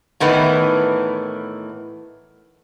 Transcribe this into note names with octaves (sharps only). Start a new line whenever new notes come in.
A2 D#3 E3 B3